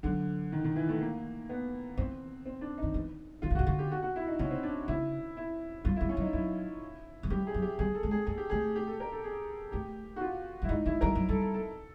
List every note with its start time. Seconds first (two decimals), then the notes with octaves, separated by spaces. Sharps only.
0.03 D3 F#3
0.52 D#3
0.64 D#3
0.76 E3
0.89 A3
1.01 A#3
1.49 B3
1.97 E3 C4
2.46 C4
2.61 D4
2.78 D#3 D#4
2.94 E3
3.42 D#3 F4
3.50 D3
3.55 F#4
3.59 C#3
3.66 D3 F#4
3.79 G4
3.91 F#4
4.02 F#4
4.16 E4
4.27 D#4
4.39 C#3 C#4
4.51 C4
4.63 D4
4.88 C#3 E4
5.37 E4
5.84 G3 F4
5.96 G3 E4
6.09 C#4
6.17 F#3
6.21 D#4
6.33 F#3 E4
7.23 F#3
7.30 G3 G4
7.47 G#4
7.54 F#3
7.62 G4
7.79 G3 G#4
7.95 A4
8.03 G#3
8.11 G#4
8.26 A#3 G#4
8.38 G4
8.50 A3 G#4
8.76 G4
8.87 A4
9.00 A#4
9.12 A4
9.24 G#4
9.72 A3 G4
10.16 F#4
10.21 F4
10.62 G3 E4
10.69 G#3 D#4
10.86 G#3 E4
11.01 G3 A#4
11.15 F#3
11.29 G3 A4
11.42 A4
11.54 A4